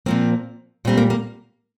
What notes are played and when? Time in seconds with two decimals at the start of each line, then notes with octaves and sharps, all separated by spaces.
0.06 A#2 F3 A#3 C4
0.85 A#2 G3 A#3 C4
0.98 A#3
1.10 A#3